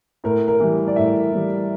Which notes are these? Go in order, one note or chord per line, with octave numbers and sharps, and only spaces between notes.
A2 A#4
A#4
E3 G3
D5
A2 E5
E3 G3